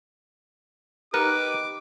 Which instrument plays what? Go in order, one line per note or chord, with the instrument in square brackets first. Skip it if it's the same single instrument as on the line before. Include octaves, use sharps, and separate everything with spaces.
[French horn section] D#4 G4 [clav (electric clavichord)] A#4 [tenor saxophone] B4 [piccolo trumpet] D6